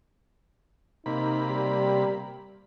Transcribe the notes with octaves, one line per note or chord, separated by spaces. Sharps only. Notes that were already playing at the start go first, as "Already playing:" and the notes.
C3 A#3 D#4 B5
G3